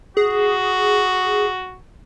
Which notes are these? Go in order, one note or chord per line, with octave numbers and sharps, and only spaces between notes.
F#4 G#4